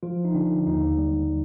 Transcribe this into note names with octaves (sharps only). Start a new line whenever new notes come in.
F3 F4
D#4
D3 D4
D#2 D#4
G3